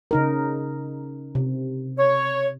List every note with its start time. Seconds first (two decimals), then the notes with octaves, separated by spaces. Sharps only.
0.11 C#3 D#4 A#4
1.35 C3
1.99 C#5